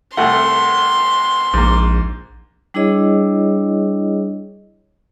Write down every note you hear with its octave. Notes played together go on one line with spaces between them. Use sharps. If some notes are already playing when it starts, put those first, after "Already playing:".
C2 A3 F#5 C6
A#1 G#2 A#3
G3 D4 E4 G#4 C#5 D#5